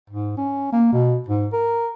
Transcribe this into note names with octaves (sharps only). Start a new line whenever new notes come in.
G#2
C#4
A#3
B2
G#2
A#4